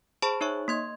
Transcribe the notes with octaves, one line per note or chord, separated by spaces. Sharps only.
G#4 C5 A5 B5 C#6
D#4 C#5 E5 C#6
A#3 C6 G#6